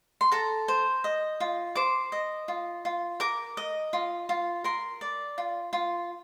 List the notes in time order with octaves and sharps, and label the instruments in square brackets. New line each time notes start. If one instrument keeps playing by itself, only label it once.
[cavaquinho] C6
A4 A#5
C5
D#5
F4
C5 D6
D#5
F4
F4
A#4 D6
D#5
F4
F4
A#4 C6
D5
F4
F4